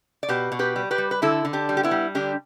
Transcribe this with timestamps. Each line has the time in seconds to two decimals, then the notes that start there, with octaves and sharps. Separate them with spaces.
0.23 D5
0.29 B2 G4 B4
0.52 B2
0.59 G4 B4
0.76 G3
0.91 G4 B4
0.98 G3
1.11 B4
1.22 D3 E4 A4
1.45 D3
1.53 D4 G4
1.69 G3
1.77 G4
1.83 B3 E4
1.91 G3
2.15 D3 D4 G4